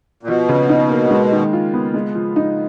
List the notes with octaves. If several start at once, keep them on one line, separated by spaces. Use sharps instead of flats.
A#2
B2 F3
C#3
D#4
A#3
G#3
D#3
F4
B3
G#3
F3
D#4